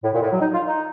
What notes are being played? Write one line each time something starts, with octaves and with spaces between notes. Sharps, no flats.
A2
A#2
A2
F#3
D#4
F4
D#4